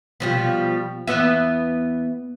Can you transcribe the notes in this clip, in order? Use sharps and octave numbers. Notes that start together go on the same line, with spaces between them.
B2 F3 G3
E2 B3 E5